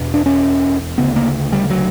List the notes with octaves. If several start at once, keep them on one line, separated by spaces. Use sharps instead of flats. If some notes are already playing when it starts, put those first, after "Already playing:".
Already playing: E2 B2
D4
C#4
D2 C#3 B3
A#3
G3
F#3